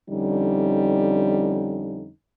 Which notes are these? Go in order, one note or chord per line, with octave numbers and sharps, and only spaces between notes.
F2 D3 G3 C#4 D#4